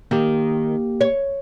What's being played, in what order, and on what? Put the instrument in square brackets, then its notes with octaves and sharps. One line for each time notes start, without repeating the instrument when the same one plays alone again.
[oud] D#3 [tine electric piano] A#3 G4
[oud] C#5